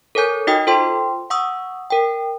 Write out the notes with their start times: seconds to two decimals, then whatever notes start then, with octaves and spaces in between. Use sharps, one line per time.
0.15 A4 A#4 C#5 G#5 G6
0.47 D#4 F#4 D#5 G5 D#6
0.67 F4 A4 C5 G5 C6
1.30 F#5 C#6 D#6 E6
1.90 A#4 G5